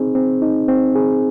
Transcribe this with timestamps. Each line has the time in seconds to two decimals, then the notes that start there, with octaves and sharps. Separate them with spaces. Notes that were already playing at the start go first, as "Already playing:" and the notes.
Already playing: C4 D#4 G#4
0.15 C4
0.42 D#4
0.68 C4
0.95 G#4